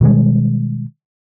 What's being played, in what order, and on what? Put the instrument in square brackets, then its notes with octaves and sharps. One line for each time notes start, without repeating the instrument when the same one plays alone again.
[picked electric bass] B2 D#3 G3 G#3